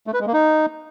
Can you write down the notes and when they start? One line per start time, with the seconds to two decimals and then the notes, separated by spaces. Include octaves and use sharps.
0.07 A3
0.14 B4
0.20 G#3
0.27 A#3
0.33 D#4